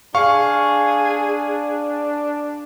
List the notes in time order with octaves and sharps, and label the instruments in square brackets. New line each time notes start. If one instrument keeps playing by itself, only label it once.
[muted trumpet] D4 [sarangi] G#4 [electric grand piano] F5 C#6